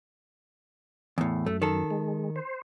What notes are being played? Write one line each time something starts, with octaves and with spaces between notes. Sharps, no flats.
E2 A2
F#2 A3
D#3 A4
G#3
C5